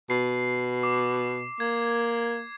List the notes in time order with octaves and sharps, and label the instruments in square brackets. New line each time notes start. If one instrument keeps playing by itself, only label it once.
[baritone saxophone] B2 [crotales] C7
[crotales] D6
[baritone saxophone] A#3 [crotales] G#6